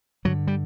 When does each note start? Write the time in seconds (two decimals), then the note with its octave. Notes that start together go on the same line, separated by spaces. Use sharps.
0.25 G2 D3 F#3
0.47 G3